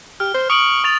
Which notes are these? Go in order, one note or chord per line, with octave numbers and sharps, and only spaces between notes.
G4 F6
C5
C#6 D#6 D7 F#7
C#6 A6 F7